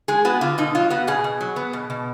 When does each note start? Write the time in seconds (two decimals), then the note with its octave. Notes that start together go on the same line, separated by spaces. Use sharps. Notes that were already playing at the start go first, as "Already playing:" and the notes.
0.08 G#3 G#4
0.25 B3 F#4
0.41 D3 F4
0.58 B2 D#4
0.75 F#3 F4
0.90 B3 F#4
1.07 B2 G#4
1.24 B2
1.41 F#3
1.56 B3
1.73 B2
1.90 B2